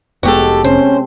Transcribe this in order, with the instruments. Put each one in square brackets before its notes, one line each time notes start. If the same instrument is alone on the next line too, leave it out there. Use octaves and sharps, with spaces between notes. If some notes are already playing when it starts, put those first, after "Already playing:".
[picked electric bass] F1 [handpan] G#3 B3 [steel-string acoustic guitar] F#4 G4 A4
[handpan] C3 C4 [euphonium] C#4 [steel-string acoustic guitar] C5